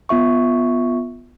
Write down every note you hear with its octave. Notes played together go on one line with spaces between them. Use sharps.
B3 F4 E5 C#6